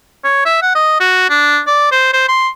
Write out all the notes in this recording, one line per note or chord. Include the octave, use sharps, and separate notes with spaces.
C#5
E5
F#5
D#5
F#4
D4
D5
C5
C5
C6